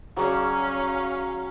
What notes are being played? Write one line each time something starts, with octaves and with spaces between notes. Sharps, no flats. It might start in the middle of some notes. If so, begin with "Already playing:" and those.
C#3 F#3 C#4 D4 F5